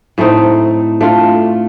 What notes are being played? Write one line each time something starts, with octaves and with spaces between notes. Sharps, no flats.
A2 A3 C4 D#4
A3 D4 F4